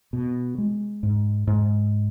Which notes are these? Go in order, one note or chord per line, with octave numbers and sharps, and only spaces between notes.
B2
G#3
G#2
G#2